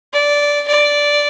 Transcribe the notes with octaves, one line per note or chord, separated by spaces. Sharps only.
D5
D5